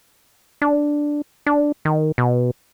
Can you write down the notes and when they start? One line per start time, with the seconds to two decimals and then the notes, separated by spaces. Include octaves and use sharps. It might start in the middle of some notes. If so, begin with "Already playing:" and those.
0.62 D4
1.46 D4
1.85 D#3
2.18 B2